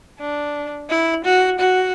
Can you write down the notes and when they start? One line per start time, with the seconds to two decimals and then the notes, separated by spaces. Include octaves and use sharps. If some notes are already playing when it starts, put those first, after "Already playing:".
0.20 D4
0.90 E4
1.25 F#4
1.60 F#4